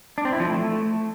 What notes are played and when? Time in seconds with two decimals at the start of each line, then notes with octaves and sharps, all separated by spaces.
0.18 D4
0.25 C4
0.32 E4
0.40 F3
0.47 A3